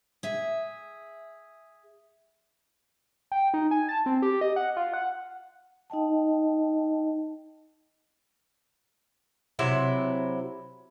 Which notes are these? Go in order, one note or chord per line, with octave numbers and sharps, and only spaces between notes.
G#4 E5
G5
D#4
G#5
A5
C4
G4
D#5
F#5
F4
F#5
D#4 D#5 G5 A5
C3 F#3 E4